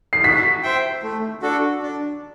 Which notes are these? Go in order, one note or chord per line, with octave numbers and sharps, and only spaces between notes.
C7
F#4 B6
C5 E5 G5
A3
D4 F#4 A4
D4